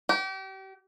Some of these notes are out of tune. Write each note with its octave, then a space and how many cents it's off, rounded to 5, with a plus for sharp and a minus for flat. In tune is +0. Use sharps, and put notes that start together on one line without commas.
G4 -35